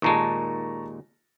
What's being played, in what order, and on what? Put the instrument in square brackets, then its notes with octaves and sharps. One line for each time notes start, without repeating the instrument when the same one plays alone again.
[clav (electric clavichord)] D#2 A#2 G#3 [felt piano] A5 A#5 C#6